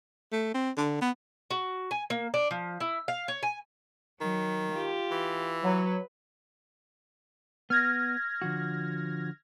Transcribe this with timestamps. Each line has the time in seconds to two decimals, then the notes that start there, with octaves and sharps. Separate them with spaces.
0.32 A3
0.54 C4
0.77 D3
1.01 B3
1.51 F#4
1.91 G#5
2.10 A#3
2.34 D4
2.51 F3
2.81 E4
3.08 F5
3.28 C#5
3.43 G#5
4.21 D#3 F#3
4.72 F4 G4
5.11 E3
5.64 F#3 B4
7.70 B3 F6 G#6 A#6
8.42 D3 F3 F#4